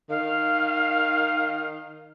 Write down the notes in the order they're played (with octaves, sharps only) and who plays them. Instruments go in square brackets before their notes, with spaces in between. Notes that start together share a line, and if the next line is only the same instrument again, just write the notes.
[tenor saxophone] D#3 [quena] F5